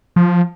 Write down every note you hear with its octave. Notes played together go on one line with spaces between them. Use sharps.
F3